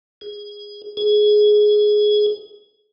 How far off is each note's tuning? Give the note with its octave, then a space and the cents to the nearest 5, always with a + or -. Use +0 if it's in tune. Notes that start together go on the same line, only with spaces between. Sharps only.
G#4 -10
G#4 +15